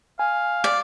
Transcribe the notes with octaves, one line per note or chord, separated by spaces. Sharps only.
F5 G#5
D5